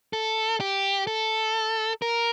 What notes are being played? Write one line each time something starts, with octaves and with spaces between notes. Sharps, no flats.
A4
G4
A4
A#4